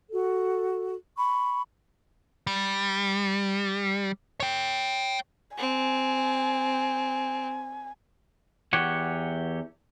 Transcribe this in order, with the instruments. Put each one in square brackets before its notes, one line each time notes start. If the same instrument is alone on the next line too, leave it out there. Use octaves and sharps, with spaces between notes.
[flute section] F#4 A4
B5 C#6
[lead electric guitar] G3
C#5 G5
[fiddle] C4 [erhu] G#5
[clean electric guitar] E2 E3 G4 C#5 F#5